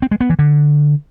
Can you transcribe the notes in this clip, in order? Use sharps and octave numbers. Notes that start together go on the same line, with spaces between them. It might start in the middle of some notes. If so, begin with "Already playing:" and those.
C4
G#3
B3
E3
D3